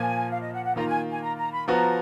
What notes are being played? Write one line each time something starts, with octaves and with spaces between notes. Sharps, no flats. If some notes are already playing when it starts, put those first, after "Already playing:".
Already playing: A#2 F3 A#3 G#5
F5
D#5
F#5
F#5
D#3 A#3 F4 A#5
G#5
G#5
A#5
A#5
B5
F3 B3 F#4 A#5